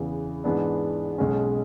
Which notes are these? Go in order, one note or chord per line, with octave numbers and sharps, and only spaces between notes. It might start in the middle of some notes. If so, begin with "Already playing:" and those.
Already playing: E2 C#3 E3 B3
G#2 E3 G#3 B3 D4
B1 B2 G#3 C#4